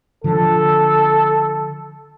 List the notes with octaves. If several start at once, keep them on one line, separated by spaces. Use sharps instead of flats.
D3 F3 A4